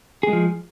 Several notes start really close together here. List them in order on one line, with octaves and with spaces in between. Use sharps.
G#4 G#3 F3